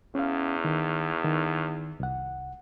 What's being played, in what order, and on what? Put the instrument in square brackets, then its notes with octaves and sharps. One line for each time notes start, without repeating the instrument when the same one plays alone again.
[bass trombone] E2 [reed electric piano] C#4 F5
[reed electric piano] D#3
D#3
C2 F#5